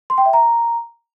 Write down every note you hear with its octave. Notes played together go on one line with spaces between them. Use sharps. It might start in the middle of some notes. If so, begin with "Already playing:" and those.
C6
G5
E5
A#5